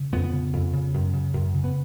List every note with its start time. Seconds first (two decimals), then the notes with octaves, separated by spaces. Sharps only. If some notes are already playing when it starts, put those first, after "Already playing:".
Already playing: C#3
0.12 F2 B3
0.33 C#3
0.53 F2
0.73 C#3
0.94 F#2
1.13 C#3
1.33 F#2
1.54 C#3
1.64 B3